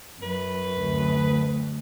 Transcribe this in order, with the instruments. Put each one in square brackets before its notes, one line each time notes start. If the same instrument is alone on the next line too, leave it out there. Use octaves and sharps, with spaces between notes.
[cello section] F#2 [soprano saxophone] B4
[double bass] D2